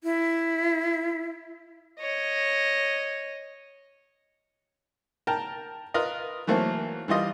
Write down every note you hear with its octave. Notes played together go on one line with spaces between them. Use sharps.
E4
C#5 D#5
A#4 G5 A5 A#5
F4 A#4 B4 D#5
E3 F#3 A3 A#3 C4
E3 G3 F4 D#5